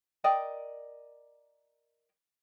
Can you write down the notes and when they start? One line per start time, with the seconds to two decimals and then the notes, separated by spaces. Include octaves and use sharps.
0.24 A#4 D5 D#5 G5